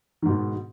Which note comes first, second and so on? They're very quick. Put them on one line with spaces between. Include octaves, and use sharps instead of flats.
D#3 G#2 B2